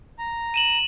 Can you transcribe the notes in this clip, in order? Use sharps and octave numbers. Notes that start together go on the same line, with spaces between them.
A#5
D#7 E7 F#7